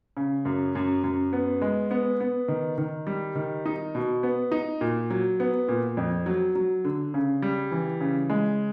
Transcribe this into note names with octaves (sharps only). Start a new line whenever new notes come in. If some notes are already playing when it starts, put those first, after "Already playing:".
C#3
F#2
F#2
F#2
B3
G#3
B3
B3
D#3
D#3
G3
D#3
D#4
B2
B3
D#4
A#2
F#3
B3
A#2
F2
F#3
F#3
D3
C#3
G3
E3
C#3
G#3